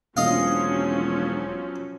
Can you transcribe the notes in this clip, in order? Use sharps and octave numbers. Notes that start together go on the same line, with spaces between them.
E1 F3 F#3 A#3 C#4 D4 D#5 F5